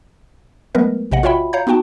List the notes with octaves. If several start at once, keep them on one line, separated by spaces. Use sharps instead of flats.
F#3 G#3 A3 B3 A#4 B4
A#1 C3 D#5 F#5
F4 F#4 C#5 E5 G5 B5
C#5 F5 A#5 G6
B3 D#4 F#4 G5 A5